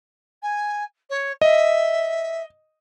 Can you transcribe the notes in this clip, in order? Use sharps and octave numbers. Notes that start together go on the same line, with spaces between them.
G#5
C#5
D#5 E5